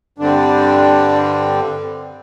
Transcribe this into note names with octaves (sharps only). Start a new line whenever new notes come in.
G2 D3 G3 C4 D4